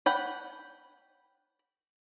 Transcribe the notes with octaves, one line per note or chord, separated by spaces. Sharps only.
F#5 G5 B5